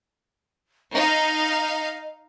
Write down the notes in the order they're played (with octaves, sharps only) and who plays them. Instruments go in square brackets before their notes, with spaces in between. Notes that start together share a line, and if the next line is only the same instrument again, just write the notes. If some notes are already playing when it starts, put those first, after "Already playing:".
[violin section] D#4 F5 [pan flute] D#5